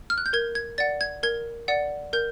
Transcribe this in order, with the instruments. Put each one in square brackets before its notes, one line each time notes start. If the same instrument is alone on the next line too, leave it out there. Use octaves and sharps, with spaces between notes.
[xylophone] F6
F#6
G6
A#4 G#6
G#6
D5 F#5 A6
G#6
A#4 G#6
D5 F#5
A#4 G6